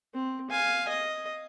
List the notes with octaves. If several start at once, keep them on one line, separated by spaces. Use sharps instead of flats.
C4
F5 G#5
D#5